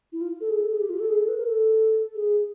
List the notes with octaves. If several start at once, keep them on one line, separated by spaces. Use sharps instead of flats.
E4
F4
A4
G#4
A4
G#4
G4
F4
A4
G#4
A4
B4
A#4
A4
G#4